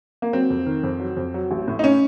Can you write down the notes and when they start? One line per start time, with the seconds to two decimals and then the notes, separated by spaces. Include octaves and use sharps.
0.22 A#3
0.33 F#3 C4
0.50 F2
0.66 D#3
0.83 F2
1.00 F#3
1.17 F2
1.34 F#3
1.51 A1
1.68 A2
1.79 D#4
1.84 C#4